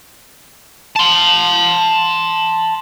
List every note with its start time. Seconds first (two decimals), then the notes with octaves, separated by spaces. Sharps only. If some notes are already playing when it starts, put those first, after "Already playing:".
0.96 A5 C6